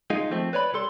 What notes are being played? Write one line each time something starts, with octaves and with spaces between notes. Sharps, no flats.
G#3 D#4 F4
F3 A3 C4
B4 C#5 D5 B5
C2 G3 A4 C6